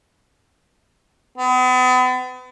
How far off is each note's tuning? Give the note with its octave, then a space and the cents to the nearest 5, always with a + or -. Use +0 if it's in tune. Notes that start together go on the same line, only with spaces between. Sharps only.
B3 +40